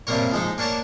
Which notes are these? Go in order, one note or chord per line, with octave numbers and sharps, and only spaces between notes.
G2 C3 G3 A#3 A#4 C#5
F3 G#3 D#4
A#3 D4 C#5 A5 A#5